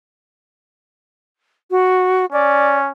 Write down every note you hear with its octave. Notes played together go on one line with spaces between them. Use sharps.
F#4
C#4 D5